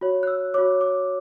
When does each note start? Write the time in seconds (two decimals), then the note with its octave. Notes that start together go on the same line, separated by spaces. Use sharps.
0.01 F#4 C#5
0.23 F#6
0.27 E6
0.54 F#4 C#5 D6
0.81 D6